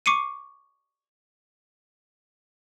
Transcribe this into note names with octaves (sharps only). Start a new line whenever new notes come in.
C#6 D6 C7 C#7 D#7